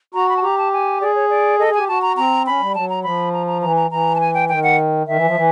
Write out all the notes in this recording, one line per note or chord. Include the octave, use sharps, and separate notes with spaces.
F#4 A#5
B5
A5
G4 A#5
A5
G#5
G#4 D5
C#5
D5
A4 D#5
G#4
G4 G#5
F#4 A5
A#5
C4 A#5
C#4 B5
G3
F#3 A5
A#5
F3 B5
A#5
A#5
E3 A#5
A#5
E3 A#5
A5
G#5
G5
D#3 G5
F#5
D#3 E5
E3
F3
E3